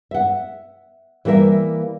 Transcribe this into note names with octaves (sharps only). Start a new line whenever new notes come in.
E5 F#5
E3 G3 A#3 A#4 E5